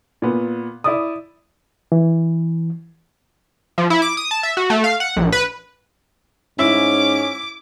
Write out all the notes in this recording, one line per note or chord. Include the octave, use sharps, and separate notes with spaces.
A#2 B3
E4 D5 D#6
E3
F3
E4
D6
D#6
A5
E5
F#4
A3
F5
F#5
A#1
B4
G#2 C#4 E4 D6